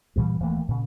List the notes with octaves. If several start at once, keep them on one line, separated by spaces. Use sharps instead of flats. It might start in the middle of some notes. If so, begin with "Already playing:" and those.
G2 A#2 E3 G3
D#1 E3 A3 A#3
A#2 C#3